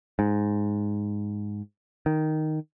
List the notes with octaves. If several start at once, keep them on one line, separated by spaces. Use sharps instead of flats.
G#2
D#3